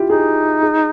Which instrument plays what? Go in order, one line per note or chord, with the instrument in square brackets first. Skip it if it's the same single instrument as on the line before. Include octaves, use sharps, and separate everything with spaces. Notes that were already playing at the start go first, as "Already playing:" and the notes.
Already playing: [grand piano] E4 F4 G4
[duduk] D#4 [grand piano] G#4
[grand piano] G#4